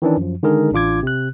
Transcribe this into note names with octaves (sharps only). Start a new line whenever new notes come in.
D#3 E3 C#4 D4
F#2 F3
D3 D#3 G#3 D#4 G#4 A#4
A1 D4 F4 D6 G#6
C3 F#6